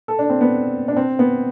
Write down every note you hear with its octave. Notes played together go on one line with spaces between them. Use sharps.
A4
D4
C4
B3
D4
C4
B3